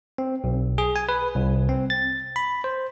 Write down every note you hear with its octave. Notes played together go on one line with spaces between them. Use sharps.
C4
B1
G#4
G#5
B4
C2
C4
A6
B5
C5